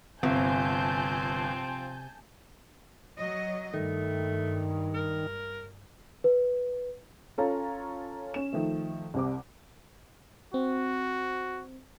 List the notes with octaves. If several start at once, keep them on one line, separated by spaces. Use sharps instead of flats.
G1 C3 F3 C4 G#5 A5 G6
F#3 D#5
G2 D#3 A3
A#4
B4
C#4 F4 A4 C#5 A#5
C#4 E7
D#3 F3 A3
C2 C3 D6
C4 F#4